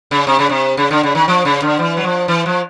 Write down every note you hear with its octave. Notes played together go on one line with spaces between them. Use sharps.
C#3
C3
C#3
C3
C#3
D3
C#3
D#3
F3
C#3
D3
E3
F#3
F3
E3
F3